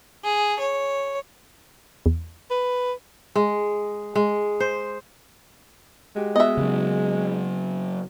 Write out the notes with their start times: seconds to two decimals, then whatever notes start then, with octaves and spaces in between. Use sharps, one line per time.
0.24 G#4
0.59 C#5
2.06 E2
2.50 B4
3.35 G#3
4.15 G#3
4.60 C5
6.16 G#3 F#4 G4
6.36 B3 F#4 D#5 E5
6.57 C#3 F#3